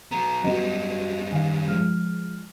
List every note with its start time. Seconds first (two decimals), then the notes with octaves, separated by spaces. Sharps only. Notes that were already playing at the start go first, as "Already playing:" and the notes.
0.11 F#3 B3 A#5
0.44 F#2 F#3 G3 B3 F#4 D#5
1.32 D#3 F5 G#5
1.68 F3 G#3 F6